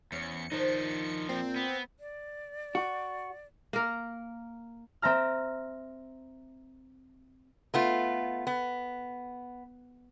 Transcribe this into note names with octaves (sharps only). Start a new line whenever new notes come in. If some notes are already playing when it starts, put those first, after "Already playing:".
E2 C#4 C#5 C#7
D#3 F3 D4 D#4 C5
A#2 C4
B3
D5
F#4
A#3 A#4
C4 E5 A#5 F6
A3 B3 F4
B3